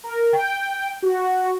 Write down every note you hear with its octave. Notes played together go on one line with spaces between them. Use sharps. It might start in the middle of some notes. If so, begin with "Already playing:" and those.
A#4
G5
F#4